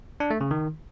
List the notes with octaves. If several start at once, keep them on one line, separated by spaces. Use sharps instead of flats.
D4
A3
C#3
D#3